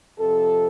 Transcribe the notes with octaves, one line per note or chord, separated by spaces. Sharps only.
F2 C3 F3 A4